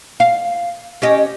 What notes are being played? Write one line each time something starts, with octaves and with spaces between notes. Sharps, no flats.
F5
C#4 G4 D#5